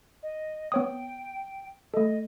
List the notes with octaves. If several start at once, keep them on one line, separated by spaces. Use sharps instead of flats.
D#5
B3 C#5 G5 D#6
A3 A4 D#5